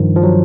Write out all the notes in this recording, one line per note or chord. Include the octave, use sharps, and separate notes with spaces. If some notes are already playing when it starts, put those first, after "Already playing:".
Already playing: G2 D#3 F3
F3
F#3